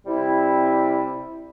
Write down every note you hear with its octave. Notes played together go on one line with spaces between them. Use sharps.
C3 G3 C4 E4